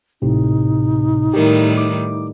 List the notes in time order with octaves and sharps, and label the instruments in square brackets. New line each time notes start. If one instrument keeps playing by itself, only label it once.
[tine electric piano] G#1 A2 C3 [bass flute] D#4
[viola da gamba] A2 D#3 G3 [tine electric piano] G4 A#4
[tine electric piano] D6